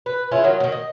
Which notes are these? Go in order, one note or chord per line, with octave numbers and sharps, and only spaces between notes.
B4
C#4 E4 F4 G#4
D#3 F#3
B2 D#3
D#5